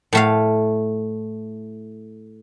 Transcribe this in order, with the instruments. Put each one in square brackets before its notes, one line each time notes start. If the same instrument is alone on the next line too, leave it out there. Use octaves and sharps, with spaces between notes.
[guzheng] A2 A3 F5